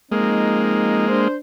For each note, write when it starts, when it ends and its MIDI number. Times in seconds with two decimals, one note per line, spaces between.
0.12 1.06 53
0.12 1.28 56
0.12 1.28 58
0.12 1.06 60
0.12 1.06 63
1.08 1.35 62
1.08 1.35 72